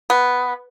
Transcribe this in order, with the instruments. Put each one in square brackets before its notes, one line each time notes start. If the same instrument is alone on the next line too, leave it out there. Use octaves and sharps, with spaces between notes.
[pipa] B3